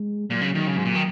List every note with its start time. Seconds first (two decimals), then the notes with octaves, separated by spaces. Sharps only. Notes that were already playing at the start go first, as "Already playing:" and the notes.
Already playing: G#3
0.30 A#2 F#3
0.41 C#3
0.55 D#3
0.67 C#3
0.77 G#2
0.85 A#2
0.95 D#3